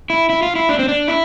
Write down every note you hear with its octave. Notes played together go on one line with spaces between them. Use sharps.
E4
E4
F4
E4
D4
C4
D4
E4